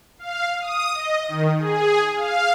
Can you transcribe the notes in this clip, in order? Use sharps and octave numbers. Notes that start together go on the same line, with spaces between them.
F5
D#6
D#5
D#3
G#4
F5